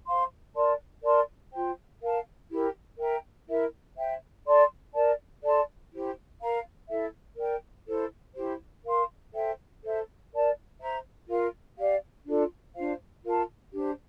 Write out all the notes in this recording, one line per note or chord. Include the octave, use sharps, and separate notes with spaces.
C5 F5 C6
A#4 D5 A5 C6
A#4 D5 A5 C6
F4 C5 G5
A#4 F5 A5
E4 G4 A#4
A#4 E5 G5 A#5
E4 A#4 E5
C5 E5 G5
A4 D5 A5 C6
A#4 D5 A5
A4 D5 A5 C6
E4 G4 C5
A#4 F5 A#5
E4 A4 E5
A#4 D5 G5
E4 A4 C5
E4 G4 C5
A#4 F5 C6
A4 C5 E5 G5
A4 C5 E5
A#4 D5 A5
C5 E5 A#5
F4 A#4 F5
G4 D5 F5
D4 F4 A4
D4 F4 C5 F5
F4 A#4 F5 A5
D4 G4 C5